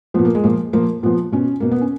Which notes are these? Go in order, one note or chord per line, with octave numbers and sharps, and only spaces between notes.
A#2 F3 B3
A#3
G#3
A#2 F3 A#3
A#2 F3 A#3
A#2 F3 B3
B2 C#4
B2 A#3
B3
C#4